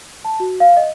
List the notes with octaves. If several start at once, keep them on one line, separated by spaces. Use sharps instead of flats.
A5
F#4
F5
D#5